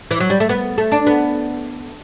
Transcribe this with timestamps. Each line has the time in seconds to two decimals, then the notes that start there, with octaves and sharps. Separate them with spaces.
0.11 E3
0.20 F#3
0.30 G3
0.40 A3
0.49 B3
0.78 A3
0.92 D4
1.07 B3